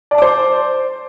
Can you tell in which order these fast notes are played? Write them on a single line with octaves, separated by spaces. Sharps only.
D5 A5 D6 C5